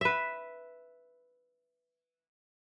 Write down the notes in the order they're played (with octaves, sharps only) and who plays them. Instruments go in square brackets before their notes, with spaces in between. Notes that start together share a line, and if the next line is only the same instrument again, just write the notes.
[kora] B4 E5